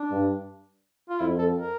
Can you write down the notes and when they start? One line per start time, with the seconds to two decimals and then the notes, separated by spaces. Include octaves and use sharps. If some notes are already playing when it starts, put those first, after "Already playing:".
Already playing: D4
0.11 G2
1.09 F4
1.21 F2 E4
1.39 A4
1.58 A#4